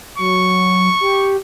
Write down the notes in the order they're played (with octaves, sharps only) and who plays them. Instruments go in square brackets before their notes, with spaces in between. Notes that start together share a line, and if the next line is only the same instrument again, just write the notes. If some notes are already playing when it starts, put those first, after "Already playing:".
[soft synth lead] F#3 [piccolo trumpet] C#6
[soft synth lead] G4